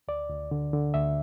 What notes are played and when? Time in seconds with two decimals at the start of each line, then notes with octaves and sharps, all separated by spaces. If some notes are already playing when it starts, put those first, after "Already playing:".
0.08 D2 D5
0.30 D2
0.51 D3
0.73 D3
0.94 D2 E5